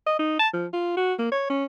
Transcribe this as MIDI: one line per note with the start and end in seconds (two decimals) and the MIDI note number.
0.07 0.16 75
0.19 0.39 63
0.40 0.48 81
0.53 0.67 53
0.73 0.93 65
0.97 1.14 66
1.19 1.32 58
1.32 1.49 73
1.50 1.65 61